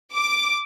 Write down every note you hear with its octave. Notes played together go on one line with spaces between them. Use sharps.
D6